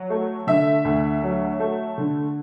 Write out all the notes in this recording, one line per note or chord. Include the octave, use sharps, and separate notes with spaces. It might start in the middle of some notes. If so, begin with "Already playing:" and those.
Already playing: F#3
A3
D3 E5
D2
F#3
A3
D3